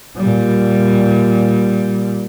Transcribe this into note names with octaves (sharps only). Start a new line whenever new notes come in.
A#2 G3